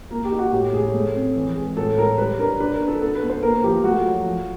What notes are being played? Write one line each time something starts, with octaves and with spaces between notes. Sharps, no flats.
A#3 A#4
G4
D#4
F#4
A2 G4
A2 G#4
A3
C4
E3
G#3
A2 A4
A2 A#4
G3 B4
D4 A#4
D4 B4
A#4
D4
A4
B3 A4
B4
B3
C5
A#3 A#4
F3 G4
A3 F#4
F#3
F3